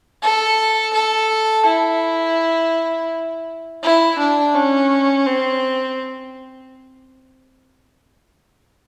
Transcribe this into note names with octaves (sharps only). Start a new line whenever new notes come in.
A4
A4
E4
E4
D4
C#4
C4